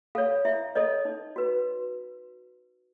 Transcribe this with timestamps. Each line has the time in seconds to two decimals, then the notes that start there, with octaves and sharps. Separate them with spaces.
0.15 A4 C#5 F5
0.45 E4 E5
0.75 A4 C#5 D#5
1.05 D#4
1.36 F#4 B4